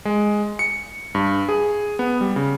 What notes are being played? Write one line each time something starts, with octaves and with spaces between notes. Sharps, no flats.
G#3
C#7
G2
G#4
B3
G3
C#3